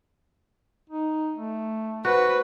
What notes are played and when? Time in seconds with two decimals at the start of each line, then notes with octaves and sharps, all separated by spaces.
0.89 D#4
1.36 A3
2.05 F#4 B4 C5